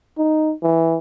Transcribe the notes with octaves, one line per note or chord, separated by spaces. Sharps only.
D#4
E3